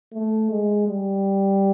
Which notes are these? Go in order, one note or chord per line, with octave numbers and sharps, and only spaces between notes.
A3
G#3
G3